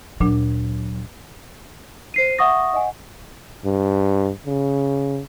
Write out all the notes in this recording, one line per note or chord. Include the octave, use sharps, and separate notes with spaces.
D2 A#2 F#3 D4
C5 C7 D#7
E5 F#5 C#6 D#6 A#6
D#5 F#5 G#5
G2
C#3